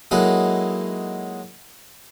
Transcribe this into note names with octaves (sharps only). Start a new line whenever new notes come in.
F#3 G#3 A#3 D#4 E4 A4